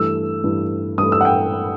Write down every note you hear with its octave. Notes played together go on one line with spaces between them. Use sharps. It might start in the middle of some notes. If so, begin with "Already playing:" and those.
Already playing: G2 E3 A3 E6
G2 E3 A3
G2 E3 A3 D#6
E6
F#5
G5